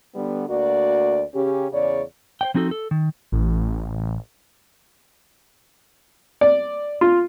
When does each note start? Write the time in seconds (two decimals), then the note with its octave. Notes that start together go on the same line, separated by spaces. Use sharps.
0.15 D3 G3 B3
0.49 D2 A#3 F#4 D5
1.34 C#3 C#4 G4
1.71 E2 C#3 C#5 D5
2.41 C5 D5 G5
2.54 F3 C4 D#4 F#4 A4
2.71 A4
2.91 D#3
3.32 A1
6.41 D5
7.01 F4